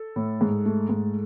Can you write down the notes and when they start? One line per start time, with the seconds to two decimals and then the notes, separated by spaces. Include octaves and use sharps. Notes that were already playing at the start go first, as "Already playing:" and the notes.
Already playing: A4
0.16 A2
0.41 G#2
0.66 A3
0.89 G#2